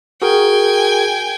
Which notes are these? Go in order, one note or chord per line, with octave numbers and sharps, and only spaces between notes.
F#4 G#4 A#4 G5 G#5